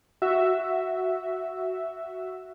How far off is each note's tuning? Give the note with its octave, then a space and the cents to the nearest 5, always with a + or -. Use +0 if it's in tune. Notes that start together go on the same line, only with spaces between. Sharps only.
F#4 +0 E5 +0